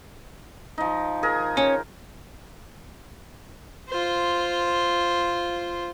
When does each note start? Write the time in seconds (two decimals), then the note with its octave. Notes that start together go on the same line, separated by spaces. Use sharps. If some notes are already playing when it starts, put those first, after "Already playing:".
0.78 F3 D#4
1.23 G#4 A#4
1.57 C#4
3.89 F4 C5